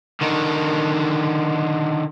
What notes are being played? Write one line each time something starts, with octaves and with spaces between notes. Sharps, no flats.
D3 D#3